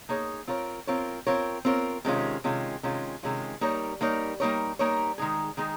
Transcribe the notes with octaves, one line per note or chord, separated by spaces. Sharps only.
A#3 D#4 G#4 C#5
C4 F4 A#4 C#5
C4 F4 A#4 C#5
C4 F4 A#4 C#5
C4 F4 A#4 C#5
C3 D#3 G#3 C#4 F4
C3 D#3 G#3 C#4 F4
C3 D#3 G#3 C#4 F4
C3 D#3 G#3 C#4 F4
G3 A#3 D#4 A#4 C#5
G3 A#3 D#4 A#4 C#5
G3 A#3 D#4 A#4 C#5
G3 A#3 D#4 A#4 C#5
D#3 G#3 D#4 G#4
D#3 G#3 D#4 G#4